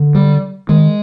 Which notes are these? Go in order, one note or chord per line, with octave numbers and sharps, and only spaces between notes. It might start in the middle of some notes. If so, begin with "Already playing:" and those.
Already playing: D3
G3
D#3 G#3